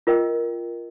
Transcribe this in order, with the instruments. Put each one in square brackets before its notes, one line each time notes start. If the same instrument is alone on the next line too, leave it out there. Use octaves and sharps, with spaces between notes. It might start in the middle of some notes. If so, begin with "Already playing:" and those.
[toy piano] F4 A#4 D#5 G5